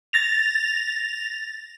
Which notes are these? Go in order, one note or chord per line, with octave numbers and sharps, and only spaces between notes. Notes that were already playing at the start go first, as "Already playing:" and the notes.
A6 A#6 F7